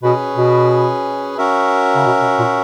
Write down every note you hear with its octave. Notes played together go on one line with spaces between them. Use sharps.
B2 C#4 G#4 B4
B2
C#4 F#4 A#4 E5
C#3
B2
B2
A#2